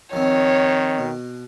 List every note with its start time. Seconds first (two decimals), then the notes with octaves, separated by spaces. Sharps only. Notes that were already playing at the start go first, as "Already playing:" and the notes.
0.13 D#3 F3 C4 C#5
0.98 B2